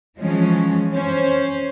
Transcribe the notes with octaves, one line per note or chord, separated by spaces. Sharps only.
E3 F3 G#3 C#4
C#4 C5